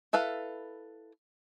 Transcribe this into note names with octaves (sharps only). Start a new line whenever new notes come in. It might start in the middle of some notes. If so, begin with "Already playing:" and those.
E4 A4 B4 F5